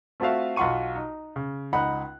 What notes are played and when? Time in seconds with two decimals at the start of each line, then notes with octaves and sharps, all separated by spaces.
0.20 A3 C4 F4 F#4 E5 F5
0.56 B1 F4 F#5 C6 C#6 D#7
0.96 D#4
1.36 C#3
1.73 C#2 D#4 F#5 B5 F#6